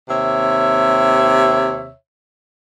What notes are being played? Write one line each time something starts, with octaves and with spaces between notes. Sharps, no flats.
D#2 C3 C#5 E5